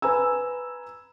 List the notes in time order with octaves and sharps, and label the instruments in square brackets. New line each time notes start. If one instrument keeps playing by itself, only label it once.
[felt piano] B4 G#5 A#5 E6